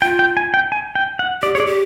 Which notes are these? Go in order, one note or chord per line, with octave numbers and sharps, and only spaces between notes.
F4 G5
G5
G#5
G5
G#5
G5
F#5
G4 D5
G#4 C#5
D5
G4